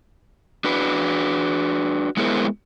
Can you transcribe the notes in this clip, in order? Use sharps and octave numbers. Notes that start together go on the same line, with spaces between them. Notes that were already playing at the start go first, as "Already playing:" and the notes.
D4 F#4 B4
G#3 B3 E4 G#4 A#4 C5